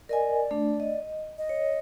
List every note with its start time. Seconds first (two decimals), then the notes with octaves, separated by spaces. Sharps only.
0.09 A#4 D5 D#5 G#5
0.51 A3 D4
0.80 D#5
1.38 D#5
1.49 C#5